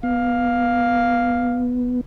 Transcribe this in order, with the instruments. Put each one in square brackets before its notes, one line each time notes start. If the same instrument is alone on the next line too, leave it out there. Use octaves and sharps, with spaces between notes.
[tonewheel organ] B3 [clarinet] F5